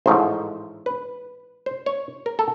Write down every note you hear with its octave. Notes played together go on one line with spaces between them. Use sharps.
A1 G#2 F3 A3 C5
B4
C5
C#5
A#4
A4